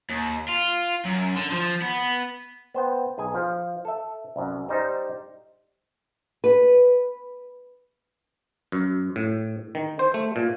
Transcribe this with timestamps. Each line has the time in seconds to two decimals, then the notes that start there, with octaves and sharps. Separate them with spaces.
0.10 D#2
0.48 F4
1.05 F#2
1.36 D3
1.52 F3
1.82 B3
2.74 B3 C5 G5
3.18 B1 G#4 G#5
3.34 F3
3.85 A4 E5
4.36 C2 F#2
4.69 G3 D#4 C5
6.44 B4
8.72 F#2
9.16 A2
9.75 D#3
9.99 C5
10.14 A3
10.36 A#2